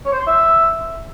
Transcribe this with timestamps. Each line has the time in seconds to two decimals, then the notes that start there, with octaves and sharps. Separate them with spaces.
0.05 C#5
0.12 C5
0.20 C6
0.27 E5